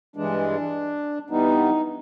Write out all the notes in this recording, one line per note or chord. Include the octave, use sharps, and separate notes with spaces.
G2 E3 G#3 D4
G2 E3 G3 B3 D#4